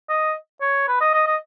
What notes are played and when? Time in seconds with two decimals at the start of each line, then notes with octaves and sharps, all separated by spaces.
0.09 D#5
0.61 C#5
0.88 B4
1.01 D#5
1.14 D#5
1.27 D#5